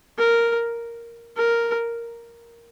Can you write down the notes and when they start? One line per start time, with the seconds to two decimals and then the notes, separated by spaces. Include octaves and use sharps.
0.18 A#4
1.37 A#4